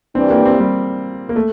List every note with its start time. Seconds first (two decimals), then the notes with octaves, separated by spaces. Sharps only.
0.15 G2 E3 G3 C4 D4
0.30 A#3
0.45 C4
0.60 G3
1.29 A#3
1.36 A3